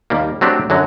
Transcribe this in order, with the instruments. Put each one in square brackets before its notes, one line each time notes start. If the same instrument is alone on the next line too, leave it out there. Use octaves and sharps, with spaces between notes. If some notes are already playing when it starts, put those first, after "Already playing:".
[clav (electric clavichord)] D#2 G3 A#3
F#3 A3 C4 D4 G4
F#2 D3 F#3